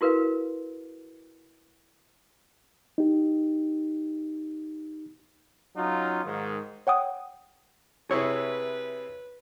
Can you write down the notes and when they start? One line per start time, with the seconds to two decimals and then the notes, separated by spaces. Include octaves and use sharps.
0.01 E4 F#4 A#4 B4 F5
2.98 D#4 G4
5.76 F#3 C#4 D#4 F4
6.25 G#2 D#3
6.87 C#5 F#5 G5 D#6
8.11 C3 E4 G#4 B4 C#5